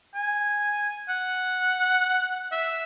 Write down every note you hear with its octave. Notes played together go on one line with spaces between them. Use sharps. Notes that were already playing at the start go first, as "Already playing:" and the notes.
G#5
F#5
E5